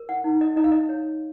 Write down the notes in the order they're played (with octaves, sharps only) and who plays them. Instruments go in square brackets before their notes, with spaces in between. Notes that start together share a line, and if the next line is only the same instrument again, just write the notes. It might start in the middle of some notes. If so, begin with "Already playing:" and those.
Already playing: [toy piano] A#4
F#5
D#4
D#5
D#4 D#5
F5
D#5
C#5